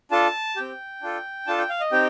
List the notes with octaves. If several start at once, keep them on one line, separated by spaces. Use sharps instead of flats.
D4 F4 A4 A5
C4 G4 G5
D4 F4 A4
D4 F4 A4 A5
G5
F5
D#5
C4 D#4 G4 G5